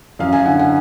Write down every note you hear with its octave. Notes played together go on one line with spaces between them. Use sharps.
F#2 F5
G#5
D3 F#5
F#5